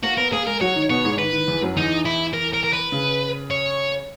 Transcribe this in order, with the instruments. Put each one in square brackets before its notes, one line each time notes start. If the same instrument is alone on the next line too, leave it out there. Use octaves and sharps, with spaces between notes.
[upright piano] A#3 A#4 [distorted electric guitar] F#4
[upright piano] B3 B4 [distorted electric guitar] A#4
[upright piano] A#3 A#4 [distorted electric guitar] G#4
[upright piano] G#3 G#4 [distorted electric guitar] A#4
[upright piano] F#3 F#4 [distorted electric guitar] C#5
[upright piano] D#3 D#4
[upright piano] B2 B3 [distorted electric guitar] C#5
[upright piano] G#2 G#3
[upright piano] D#3 [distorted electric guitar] B4
[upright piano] D#3
E2 E3
F#2 F#3
[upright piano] E2 E3 [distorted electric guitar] D#4
[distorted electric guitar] E4
A#4
A#4
A#4
B4
[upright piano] C#3
[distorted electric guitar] C#5